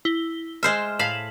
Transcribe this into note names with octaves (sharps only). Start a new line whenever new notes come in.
E4 G7
G#3 C5 E5 F6
A2 F5 B6 E7 F#7